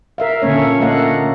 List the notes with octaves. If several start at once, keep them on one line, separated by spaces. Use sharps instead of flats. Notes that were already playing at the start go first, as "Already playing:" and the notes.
A#4 E5 F5
A#2 D3 A3 A#3 C#4 C#5
A3 A#3 A4 D#5 F5 F#5